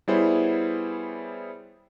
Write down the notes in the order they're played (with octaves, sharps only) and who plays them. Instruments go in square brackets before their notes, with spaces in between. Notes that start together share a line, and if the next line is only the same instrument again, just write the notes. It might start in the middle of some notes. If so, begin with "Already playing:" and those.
[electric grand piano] G3 B3 E4 G#4 C5 C#5